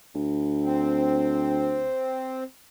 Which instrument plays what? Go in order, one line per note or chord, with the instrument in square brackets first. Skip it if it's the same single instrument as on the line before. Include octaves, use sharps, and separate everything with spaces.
[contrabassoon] D2
[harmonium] C4